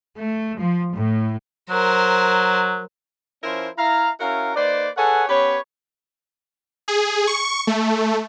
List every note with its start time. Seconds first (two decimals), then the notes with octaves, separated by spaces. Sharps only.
0.17 A3
0.56 F3
0.93 A2
1.70 F#3 A#4 C5
3.44 F3 C#4 E4 A#4 C5
3.77 E4 F5 A#5
4.20 C#4 E4 F#4 A#4 F5 A#5
4.56 A#3 D#4 B4 C5 D5
4.97 G#4 A4 B4 C#5 F#5 G#5
5.29 B3 C#4 G4 B4 C#5
6.88 G#4
7.27 C#6
7.67 A3